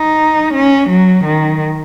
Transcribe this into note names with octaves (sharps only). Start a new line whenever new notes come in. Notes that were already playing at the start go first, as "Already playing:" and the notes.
Already playing: D#4
C#4
F#3
D#3